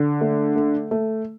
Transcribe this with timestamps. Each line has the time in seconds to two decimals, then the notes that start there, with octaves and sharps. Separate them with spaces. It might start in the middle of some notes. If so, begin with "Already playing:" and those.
Already playing: D3
0.21 A3
0.56 A3
0.91 A3